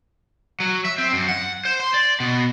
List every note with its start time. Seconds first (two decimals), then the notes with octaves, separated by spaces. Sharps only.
0.60 F#3
0.85 E5
0.98 C4
1.13 F#2
1.28 F#5
1.65 C5
1.80 C6
1.94 D5
2.20 B2